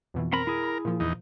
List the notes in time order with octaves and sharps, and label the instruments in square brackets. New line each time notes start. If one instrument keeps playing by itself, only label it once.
[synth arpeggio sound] F2 B2 E3
[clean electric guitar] C4 B5 [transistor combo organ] A#4
[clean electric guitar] E4 G#4
[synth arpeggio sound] B5
A#2 F3
[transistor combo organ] E2 D#4